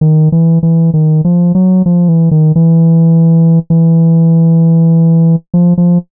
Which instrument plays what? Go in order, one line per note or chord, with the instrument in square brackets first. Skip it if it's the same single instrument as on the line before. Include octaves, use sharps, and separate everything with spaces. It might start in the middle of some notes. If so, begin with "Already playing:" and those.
[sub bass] D#3
E3
E3
D#3
F3
F#3
F3
E3
D#3
E3
E3
F3
F3